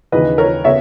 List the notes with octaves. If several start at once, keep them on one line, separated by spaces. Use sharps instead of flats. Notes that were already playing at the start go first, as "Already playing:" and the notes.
D#2 C#3 E3 B4 D#5
A#4 C#5
C#3 B3 C#5 E5